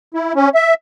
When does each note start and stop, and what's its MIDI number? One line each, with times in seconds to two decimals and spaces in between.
0.14 0.33 64
0.36 0.49 61
0.55 0.74 76